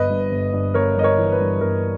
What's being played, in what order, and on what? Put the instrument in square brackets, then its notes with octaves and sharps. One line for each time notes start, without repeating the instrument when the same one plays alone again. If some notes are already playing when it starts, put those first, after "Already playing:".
Already playing: [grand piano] G1 B4 D#5
G2
G1
G2
G1 A#4 C#5
G1 D#5
A#4 C#5
E3
B4
G2
G1 A#4